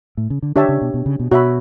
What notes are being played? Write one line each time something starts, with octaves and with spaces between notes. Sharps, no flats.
A2
C#3
D3
D3 D4 G4 C#5 E5 A5
C#3
B2
B2
C#3
B2
B2 F#4 C#5 E5 B5